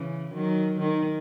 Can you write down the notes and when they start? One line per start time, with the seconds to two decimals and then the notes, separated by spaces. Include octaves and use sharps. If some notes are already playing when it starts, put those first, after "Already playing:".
Already playing: C#3 E3
0.34 D#3 F#3
0.80 D#3